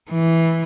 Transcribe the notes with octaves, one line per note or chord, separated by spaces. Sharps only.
E3